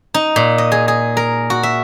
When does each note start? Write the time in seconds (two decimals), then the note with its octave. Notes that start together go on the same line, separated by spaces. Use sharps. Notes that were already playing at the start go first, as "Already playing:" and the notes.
0.14 D#4
0.36 A#2
0.58 D#5
0.72 G#4
0.88 G#4
1.17 A#4
1.50 F#4
1.63 E5